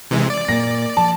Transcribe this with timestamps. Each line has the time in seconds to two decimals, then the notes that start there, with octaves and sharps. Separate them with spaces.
0.11 C3 E3 G#3
0.30 D5
0.48 A#2 A#3 A#6
0.97 F3 A5